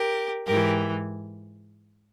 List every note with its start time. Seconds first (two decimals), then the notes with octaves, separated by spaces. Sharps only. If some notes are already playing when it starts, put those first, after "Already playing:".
Already playing: G4 A#4
0.47 G#2 E3 G4 A#4